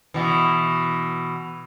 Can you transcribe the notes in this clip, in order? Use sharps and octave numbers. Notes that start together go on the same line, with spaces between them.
B2 E3